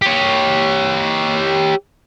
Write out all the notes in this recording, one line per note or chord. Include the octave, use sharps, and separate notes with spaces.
G4 C#5